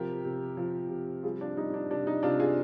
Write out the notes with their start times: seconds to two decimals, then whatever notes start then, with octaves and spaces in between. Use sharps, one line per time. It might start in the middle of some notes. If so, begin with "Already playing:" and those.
Already playing: C3 F3 G4 A#4
0.25 C3
0.57 F3
0.90 C3
1.23 G3 F4 G#4
1.41 D4 F4
1.56 G3 D#4
1.74 D4
1.90 C3 D4
2.07 D#4
2.23 C3 D4 F4
2.40 F4 G#4